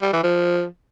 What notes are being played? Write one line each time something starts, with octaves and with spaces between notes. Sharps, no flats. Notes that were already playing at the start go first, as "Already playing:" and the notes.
G3
E3
F3